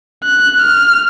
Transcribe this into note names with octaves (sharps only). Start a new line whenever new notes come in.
F#6
F6